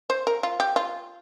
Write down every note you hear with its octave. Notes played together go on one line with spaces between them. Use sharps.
C5
A#4
F4
G4
F4